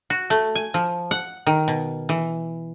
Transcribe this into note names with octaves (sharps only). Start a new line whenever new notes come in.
F#4
A3
G#5
F3
F#5
D#3
B2
E3